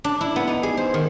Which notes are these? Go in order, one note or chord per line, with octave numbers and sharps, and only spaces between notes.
D4
E4
B3
D#4
G#4
C5
D#3